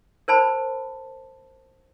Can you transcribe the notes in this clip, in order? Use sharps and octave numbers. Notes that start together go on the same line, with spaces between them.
A#4 C5 A5 B5